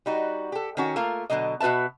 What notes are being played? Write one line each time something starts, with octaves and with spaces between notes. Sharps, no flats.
G3 D#4 F#4
G4 A4
D#3 C#4 F#4
A3 A#3 F4 A#4
B2 D3 F#3 A#3 D#5
B2 F#4 B4 E5 A5